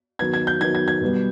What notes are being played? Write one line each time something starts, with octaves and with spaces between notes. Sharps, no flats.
D#3 F#3 B3 G#6
G#6
G6
D#3 F#3 B3 G#6
G#6
G#6
B2 G3 B3